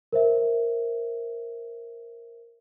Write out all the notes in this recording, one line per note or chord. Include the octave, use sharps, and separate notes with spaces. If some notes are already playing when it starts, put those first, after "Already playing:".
A#4 C5 E5